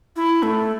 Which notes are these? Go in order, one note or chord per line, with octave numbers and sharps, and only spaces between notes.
E4
A3